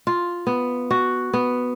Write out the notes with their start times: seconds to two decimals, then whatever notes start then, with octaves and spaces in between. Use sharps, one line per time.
0.07 F4
0.47 B3
0.91 F#4
1.33 B3